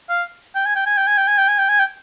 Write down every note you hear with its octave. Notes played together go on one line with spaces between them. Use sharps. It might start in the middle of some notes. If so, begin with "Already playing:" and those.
F5
G5
G#5
G5
G#5
G5
G#5
G5
G#5
G5
G#5
G5
G#5
G5